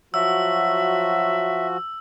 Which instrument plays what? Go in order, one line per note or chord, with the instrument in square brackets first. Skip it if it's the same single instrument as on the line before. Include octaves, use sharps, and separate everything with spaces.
[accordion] F3 F#4 [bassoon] F#3 [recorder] E5 [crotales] E6